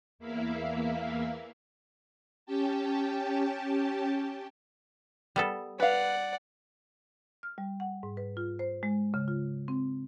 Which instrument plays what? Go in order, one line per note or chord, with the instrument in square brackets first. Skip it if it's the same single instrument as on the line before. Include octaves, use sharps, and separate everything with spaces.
[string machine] E2 E3 A#3 E4 E5 F5
C#4 G4 G5 A5
[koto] G3 B3 A4
[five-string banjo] B4 F5 [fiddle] D5 F#5
[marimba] F6
G3
F#5
G#2
B4
F4
C5
G#3
C#3
F4
C4